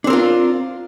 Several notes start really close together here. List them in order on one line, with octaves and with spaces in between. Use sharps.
D4 C4 A#4 F4